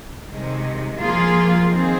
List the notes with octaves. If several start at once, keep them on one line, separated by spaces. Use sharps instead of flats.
C3 D#3 G#3
F3 A#3 F4 G#4
D#3 C4 G#4